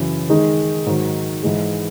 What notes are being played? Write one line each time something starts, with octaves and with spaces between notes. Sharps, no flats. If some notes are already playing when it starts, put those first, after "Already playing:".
Already playing: F#2 C#3 E3
D#3 G#3 D#4 G#4
G#2 D#3 F#3
G#2 E3 G#3